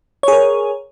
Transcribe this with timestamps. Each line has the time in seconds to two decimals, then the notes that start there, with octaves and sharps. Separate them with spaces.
0.23 C#5
0.28 G#4
0.33 A#4